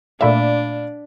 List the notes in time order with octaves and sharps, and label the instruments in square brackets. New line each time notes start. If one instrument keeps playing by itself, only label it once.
[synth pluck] A#2 A3 E5 [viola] D4 [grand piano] D5 F5 B5